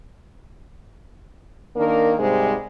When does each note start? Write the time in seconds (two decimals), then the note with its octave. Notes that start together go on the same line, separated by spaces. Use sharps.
1.76 D#3 A#3 D4 A#4
2.19 G#2 C3 G3 G#3